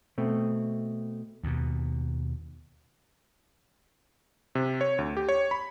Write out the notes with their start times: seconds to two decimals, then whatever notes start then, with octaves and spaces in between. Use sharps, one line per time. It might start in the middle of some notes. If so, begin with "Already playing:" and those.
0.18 B2 A3 C4
1.43 D#2 B2
4.55 C3
4.81 C#5
4.99 D2
5.17 G4
5.29 C#5
5.51 B5